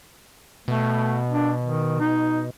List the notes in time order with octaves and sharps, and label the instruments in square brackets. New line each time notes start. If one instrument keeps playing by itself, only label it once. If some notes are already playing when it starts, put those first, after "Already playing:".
[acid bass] B2 [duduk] A3
[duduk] D4
D#3
D#4